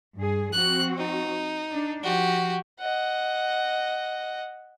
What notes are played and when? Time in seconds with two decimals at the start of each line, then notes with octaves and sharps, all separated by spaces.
0.16 G2 G#4
0.53 F3 C4 F#4 F#6
0.98 D#4
1.72 D4
2.03 F3 F#4 G4
2.80 D#5 F#5